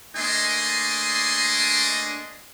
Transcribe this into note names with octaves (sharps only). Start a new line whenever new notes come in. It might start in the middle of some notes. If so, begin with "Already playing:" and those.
A3 A#3 D4 D#5 G#5 C6